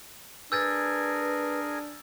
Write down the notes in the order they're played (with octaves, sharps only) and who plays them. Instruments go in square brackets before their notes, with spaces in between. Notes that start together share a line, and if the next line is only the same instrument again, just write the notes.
[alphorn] D4 [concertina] G#4 A#4 G#5 [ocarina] B4 [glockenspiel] E6 G6 A6